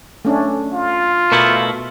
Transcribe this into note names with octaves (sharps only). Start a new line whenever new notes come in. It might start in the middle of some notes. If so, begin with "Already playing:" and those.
A3 C#4 D4
F4
B2 A3 E4 A#4